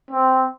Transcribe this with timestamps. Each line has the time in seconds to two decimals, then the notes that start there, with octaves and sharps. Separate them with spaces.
0.11 C4